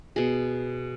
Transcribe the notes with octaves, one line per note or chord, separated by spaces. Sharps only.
B2 G#4